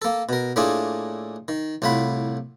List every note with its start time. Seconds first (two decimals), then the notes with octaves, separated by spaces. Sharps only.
0.02 A#3 A4
0.29 B2 A#4
0.56 A2 A3 A#3 D4 F4 G#4
1.48 D#3
1.82 C2 A2 F4 F#5 B5